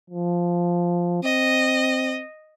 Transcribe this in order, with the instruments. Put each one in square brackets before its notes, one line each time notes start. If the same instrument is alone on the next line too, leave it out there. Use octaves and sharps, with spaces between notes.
[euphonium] F3
[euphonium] C4 [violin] D#5